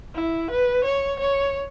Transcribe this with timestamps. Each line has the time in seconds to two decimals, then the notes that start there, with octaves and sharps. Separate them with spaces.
0.15 E4
0.51 B4
0.85 C#5
1.20 C#5